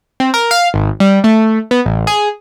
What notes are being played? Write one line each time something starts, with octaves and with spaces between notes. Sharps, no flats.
C4
A#4
F5
G#1
G3
A3
B3
A1
G#4